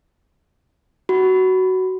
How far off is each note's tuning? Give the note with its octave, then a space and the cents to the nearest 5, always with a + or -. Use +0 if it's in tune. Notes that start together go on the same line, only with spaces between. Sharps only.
F#4 +15 B5 +10